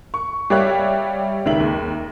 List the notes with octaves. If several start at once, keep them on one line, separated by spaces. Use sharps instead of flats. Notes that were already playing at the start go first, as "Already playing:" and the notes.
C#6
G3 G4 C#5 E5 F5 F#6
C#2 D#3 E5 F#7
D#2